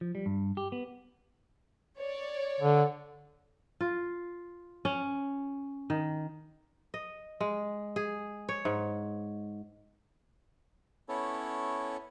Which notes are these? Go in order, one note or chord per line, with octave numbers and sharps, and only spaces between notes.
F3
G3
G2
G4
B3
C#5 D5
D3
F4
C#4
D#3
D#5
G#3
G#4
C#5
G#2
B3 C#4 E4 A4 C#5